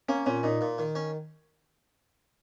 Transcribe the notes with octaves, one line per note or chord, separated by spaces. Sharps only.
A#3 C#4
A#2 C#4
A#2 D#4
A#2
D#3
C#4